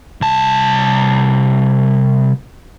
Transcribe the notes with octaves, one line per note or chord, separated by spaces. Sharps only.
C2 A5